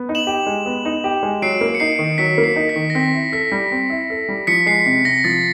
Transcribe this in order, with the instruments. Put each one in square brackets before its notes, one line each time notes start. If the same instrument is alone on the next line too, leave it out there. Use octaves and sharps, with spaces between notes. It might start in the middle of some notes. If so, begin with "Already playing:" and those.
Already playing: [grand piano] B3
D#4
[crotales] E7 F#7
[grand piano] G4
G#3
B3
D#4
G4
G#3
[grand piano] F#3 [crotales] C7 D7
[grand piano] A#3
[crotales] C#7
[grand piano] D#4 [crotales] C7
[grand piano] D#3
[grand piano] F#3 [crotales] B6 C#7
[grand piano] A#3
[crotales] C7
[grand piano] D#4
[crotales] B6
[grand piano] D#3
[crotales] A#6
[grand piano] C4 [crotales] B6
[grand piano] E4
[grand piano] A4 [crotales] B6
[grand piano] G3
C4
E4
A4
G3
[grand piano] F3 [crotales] B6 C#7
[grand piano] G#3 [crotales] C7
[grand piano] C3
[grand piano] C3 [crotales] A#6
[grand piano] F3 [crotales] A6